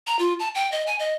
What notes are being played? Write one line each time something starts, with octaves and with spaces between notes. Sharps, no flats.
A#5
F4
A5
G5
D#5
G#5
D#5